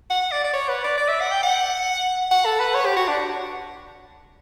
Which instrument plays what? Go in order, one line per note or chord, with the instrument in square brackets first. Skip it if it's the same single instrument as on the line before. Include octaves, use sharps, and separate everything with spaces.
[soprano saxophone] F#5
D5
D5
C#5
B4
D5
D5
E5
F#5
G5
F#5
F#5
A4
B4
C#5
G4
F#4
D4